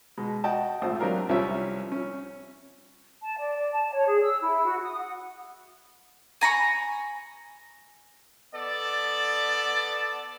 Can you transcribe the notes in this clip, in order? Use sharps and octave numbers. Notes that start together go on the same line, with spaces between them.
B2 G#3
F#4 D#5 G5 A5
G#1 A#2 A3 C5 D#6
F#3 C4 D4 G4 A#4 F5
C2 F3 C#4 G4 C#5 E5
C#4
A5
D5
D5
A5
C#5
G#4
E6
E4
F#4
D#6
F#5
G#5 A#5 B5 C#6
B3 A4 D5